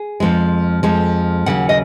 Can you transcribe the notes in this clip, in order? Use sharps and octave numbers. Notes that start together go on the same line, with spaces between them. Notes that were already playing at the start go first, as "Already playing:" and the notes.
Already playing: G#4
F2 F3 G#3
F2 F3 G#3
D#2 C#3 F#3 F#5
D#5